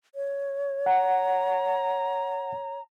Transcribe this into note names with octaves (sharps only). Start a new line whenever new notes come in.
C#5
F#5 A#5